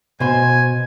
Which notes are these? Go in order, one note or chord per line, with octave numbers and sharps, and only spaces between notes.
B2 C5 G#5